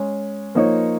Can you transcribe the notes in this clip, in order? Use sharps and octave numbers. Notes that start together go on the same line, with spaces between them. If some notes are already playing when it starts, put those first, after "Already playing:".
Already playing: G#3 C#4 G#4
F3 A#3 D#4 C#5